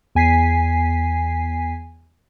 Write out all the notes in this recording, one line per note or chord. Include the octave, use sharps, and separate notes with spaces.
E2 G#5 B6 C7